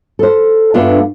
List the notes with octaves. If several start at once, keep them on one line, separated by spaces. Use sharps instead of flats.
A4 C5
G2 A3 B3 D4 F4 F5